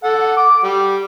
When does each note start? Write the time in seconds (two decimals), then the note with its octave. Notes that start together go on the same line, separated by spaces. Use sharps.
0.03 A4 F#5
0.37 D6
0.63 G3